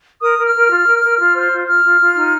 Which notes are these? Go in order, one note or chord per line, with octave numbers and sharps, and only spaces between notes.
A#4 D#6
A#4
F6
A#4
F4
A#4
A#4
F4
C5
F4
F4 F6
F4
F4
D#4